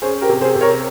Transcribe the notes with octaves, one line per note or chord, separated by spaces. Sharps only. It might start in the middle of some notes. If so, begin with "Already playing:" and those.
C#4 G#4 C5
G4 A#4
C3
G#4 C5
C3
A#4 C#5